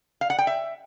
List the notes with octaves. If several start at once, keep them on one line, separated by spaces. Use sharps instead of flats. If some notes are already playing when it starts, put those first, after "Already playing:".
F5
F#5
G5
E5